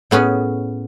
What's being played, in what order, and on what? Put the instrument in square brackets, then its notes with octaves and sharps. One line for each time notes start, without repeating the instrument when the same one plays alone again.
[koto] A2 B3 C#4 G#4